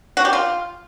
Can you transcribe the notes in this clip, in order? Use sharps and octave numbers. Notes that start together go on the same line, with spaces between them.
F#4
G4
F4